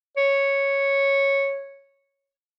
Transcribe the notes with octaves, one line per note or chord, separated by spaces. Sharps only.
C#5